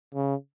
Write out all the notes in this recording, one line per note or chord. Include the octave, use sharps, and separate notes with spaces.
C#3